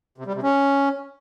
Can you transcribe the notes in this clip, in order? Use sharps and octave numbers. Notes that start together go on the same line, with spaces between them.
C3
G3
C3
C#4